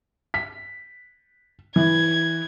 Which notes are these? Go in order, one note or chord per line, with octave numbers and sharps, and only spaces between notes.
B6
E3 G#6